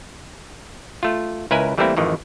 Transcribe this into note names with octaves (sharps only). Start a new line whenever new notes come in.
A3 F4
C#2 E4 A#4 B4 G#5
E3 G3 A3 A#3 C4 E4
G#1 F2 D#3 E3